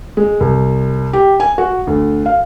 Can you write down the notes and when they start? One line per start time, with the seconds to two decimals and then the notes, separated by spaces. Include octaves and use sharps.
0.17 G#3
0.40 C2
1.13 G4
1.40 G#5
1.58 F#4
1.87 D2
2.26 F5